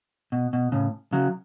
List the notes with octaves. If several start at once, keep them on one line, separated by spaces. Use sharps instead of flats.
B2
B2
A2 C#3
C#3 F#3